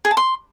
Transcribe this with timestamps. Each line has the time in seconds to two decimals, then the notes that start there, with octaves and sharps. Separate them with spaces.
0.05 G#4
0.11 A5
0.17 C6